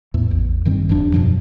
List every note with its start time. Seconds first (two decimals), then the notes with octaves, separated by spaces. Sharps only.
0.14 E2 A2
0.30 A1 E2
0.65 G2 D#3 G3 C4
0.89 D#1 F2 F3 D4
1.13 F#2 B2 F3 F#3